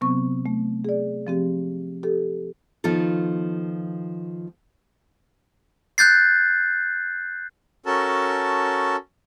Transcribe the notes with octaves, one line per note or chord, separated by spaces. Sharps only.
C3 F#3 B3 C4 C#6
A3
G#4 D5
F3 C4 G4
G4 A4
D#3 F3 B3 F4 A4
F#6 G6 A6 C7
C#4 F#4 A4 A#4 A5